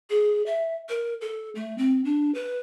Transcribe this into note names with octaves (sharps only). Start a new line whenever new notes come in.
G#4
E5
A#4
A4
A3
C4
D4
B4